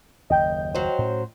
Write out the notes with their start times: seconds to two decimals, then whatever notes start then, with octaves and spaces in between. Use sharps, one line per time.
0.30 F#1 D#2 D#5 G5 G6
0.75 F#3 C5
0.98 A2 C#4